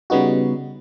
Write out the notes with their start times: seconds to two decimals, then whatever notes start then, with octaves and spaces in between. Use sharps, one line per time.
0.10 C#3 G3 B3 D#4 F#4